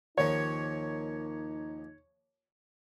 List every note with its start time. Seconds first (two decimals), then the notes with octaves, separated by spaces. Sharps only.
0.18 D#2 F3 A#3 D#4 C#5